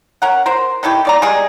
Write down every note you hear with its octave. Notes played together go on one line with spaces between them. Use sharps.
C#4 A#4 F#5
A#4 C5
D#3 A3 E4 G4
D#3 D5 A#5
G3 G#3 G#4